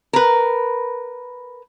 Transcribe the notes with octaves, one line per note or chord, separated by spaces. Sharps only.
A#4 B4